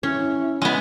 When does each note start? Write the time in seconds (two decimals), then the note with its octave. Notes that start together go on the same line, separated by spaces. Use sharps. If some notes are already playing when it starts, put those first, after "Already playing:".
0.03 C#4 E4
0.62 G#3 B3